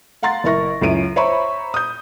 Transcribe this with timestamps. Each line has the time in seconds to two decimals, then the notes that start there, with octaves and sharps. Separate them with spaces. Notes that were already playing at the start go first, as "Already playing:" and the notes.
0.23 F5 F#5 A#5 C6 A6
0.44 F#1 E4 A#4 C#6 A#6
0.81 C#2 F#2 E4 D7 D#7
1.16 C5 C#5 E5 A#5 B5 C#6
1.74 D#6 G6